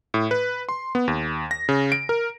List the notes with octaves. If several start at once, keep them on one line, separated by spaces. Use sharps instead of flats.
A2
B4
C6
B3
D#2
A#6
C#3
D7
A#4